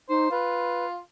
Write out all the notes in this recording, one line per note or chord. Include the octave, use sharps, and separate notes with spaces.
D#4 C5
F4 B4